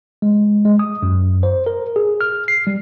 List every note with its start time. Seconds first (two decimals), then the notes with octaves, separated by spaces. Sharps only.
0.22 G#3
0.65 G#3
0.79 D#6
1.02 F#2
1.43 C5
1.67 A#4
1.96 G#4
2.21 F6
2.48 C7
2.67 G3